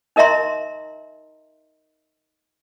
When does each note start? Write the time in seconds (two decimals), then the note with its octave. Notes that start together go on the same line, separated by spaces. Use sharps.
0.16 D#4 A#4 D#5 E5 A#5 C6